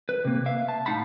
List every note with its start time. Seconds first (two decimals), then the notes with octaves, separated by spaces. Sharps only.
0.09 B4
0.25 C3 A#3
0.46 E5 F5
0.68 A5
0.86 A2 D#4 F5 F#5 A5 B5